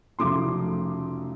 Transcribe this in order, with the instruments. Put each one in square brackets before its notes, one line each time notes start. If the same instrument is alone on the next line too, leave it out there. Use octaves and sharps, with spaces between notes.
[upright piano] F1 F2 C#3 F#3 A3 C6 D6